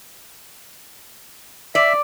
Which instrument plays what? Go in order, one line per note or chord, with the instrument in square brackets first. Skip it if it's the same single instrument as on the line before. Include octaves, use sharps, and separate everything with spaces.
[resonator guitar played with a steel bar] D5 [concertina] E5